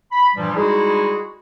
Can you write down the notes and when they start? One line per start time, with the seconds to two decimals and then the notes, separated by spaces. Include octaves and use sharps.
0.12 B5
0.35 G2 A#2 E3 F3 G3
0.56 G3 G#3 D#4 E4 F#4 G#4